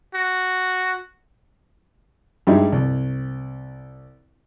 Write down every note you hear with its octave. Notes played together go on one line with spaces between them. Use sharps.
F#4
G2 G3 G#3 D#4 E4
C2